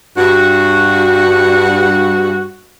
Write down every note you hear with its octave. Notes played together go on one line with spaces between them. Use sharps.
G2 F#4